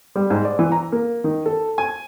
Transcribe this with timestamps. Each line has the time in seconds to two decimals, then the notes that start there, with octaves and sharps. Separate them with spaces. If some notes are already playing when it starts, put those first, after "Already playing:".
0.16 G3
0.30 G#2
0.45 D5
0.59 E3
0.72 A#5
0.92 A#3
1.24 D#3
1.46 A4
1.78 G#5